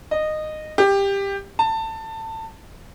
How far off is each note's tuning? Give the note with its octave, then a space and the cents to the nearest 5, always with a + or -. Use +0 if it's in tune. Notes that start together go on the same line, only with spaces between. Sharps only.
D#5 -15
G4 +15
A5 +20